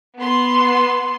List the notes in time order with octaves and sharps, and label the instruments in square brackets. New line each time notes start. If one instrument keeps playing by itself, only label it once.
[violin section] B3 C6